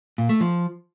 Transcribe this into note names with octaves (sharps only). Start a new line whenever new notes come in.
A#2
A3
F3